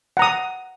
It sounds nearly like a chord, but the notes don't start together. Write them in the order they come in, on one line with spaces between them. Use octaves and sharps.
F#5 A#5 D#6